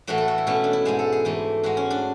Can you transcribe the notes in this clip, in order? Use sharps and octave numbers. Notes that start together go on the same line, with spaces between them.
A2 E3 A3 F#4
A4
F#4
E4
B2 A3 C#4
D4
E4
G#2 G#3 G#4
A4
G#4
G#2 E3 A3
G#2 G#3 F#4
C#4
D4